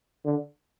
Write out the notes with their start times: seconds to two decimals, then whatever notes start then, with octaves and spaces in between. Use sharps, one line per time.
0.25 D3